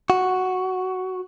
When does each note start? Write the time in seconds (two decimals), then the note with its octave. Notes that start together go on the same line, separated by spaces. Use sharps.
0.10 F#4